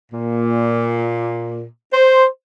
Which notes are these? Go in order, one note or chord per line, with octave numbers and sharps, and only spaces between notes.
A#2
C5